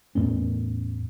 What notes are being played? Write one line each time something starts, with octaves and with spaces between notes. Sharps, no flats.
E2 A2 B3 C#4